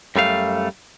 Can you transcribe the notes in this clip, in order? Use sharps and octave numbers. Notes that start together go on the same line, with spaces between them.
F#2 G3 A3 F5